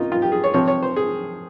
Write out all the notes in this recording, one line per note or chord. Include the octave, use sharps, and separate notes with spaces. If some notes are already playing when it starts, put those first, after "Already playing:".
Already playing: C3 A#3 C#4 D#4 F4
F4
G4
G#4
C#5
C3 F3 C4 C#5
C#5
C5
G#4